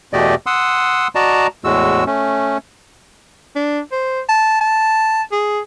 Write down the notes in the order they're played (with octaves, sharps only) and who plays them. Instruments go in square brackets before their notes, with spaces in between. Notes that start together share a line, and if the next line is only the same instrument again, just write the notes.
[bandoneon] E2 B2 A3 G4 D5 D#5
F#5 C6 D#6 E6
F#4 D5 D#5 A5 A#5
E2 A2 G#3 F#4 E6
A3 C#4
[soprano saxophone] D4
C5
A5
A5
G#4